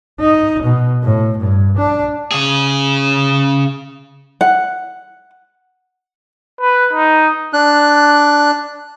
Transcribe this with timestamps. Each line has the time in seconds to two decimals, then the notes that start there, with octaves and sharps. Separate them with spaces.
0.20 D#4
0.64 B2
1.03 A2
1.39 G2
1.78 D4
2.31 C#3 G#4
4.41 F#5
6.61 B4
6.93 D#4
7.53 D4 F#6